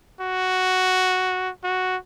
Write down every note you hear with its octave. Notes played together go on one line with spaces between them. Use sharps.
F#4
F#4